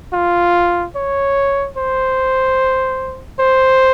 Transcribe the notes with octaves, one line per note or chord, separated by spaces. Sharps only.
F4
C#5
C5
C5